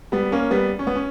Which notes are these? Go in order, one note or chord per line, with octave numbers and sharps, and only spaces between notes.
G3 B3
A#3 C#4
G3 B3
C#4
B3
C#4